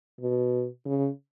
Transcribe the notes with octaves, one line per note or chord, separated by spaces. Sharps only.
B2
C#3